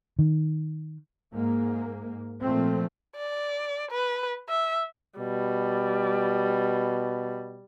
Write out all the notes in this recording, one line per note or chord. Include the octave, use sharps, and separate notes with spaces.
D#3
G#2 A#3
A#2 F3 A3 C4
D5
B4
E5
B2 G3